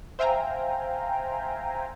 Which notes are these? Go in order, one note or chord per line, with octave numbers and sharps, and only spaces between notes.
C5 E5 F5 G5 G#5 A#5